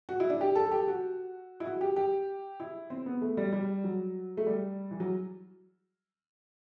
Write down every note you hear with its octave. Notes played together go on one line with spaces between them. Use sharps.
F#4
E4
D4
G4
A4
A4
G4
F#4
E4
F#4
G4
G4
E4
C4
B3
A3
G3
G3
F#3
A3
G3
E3
F#3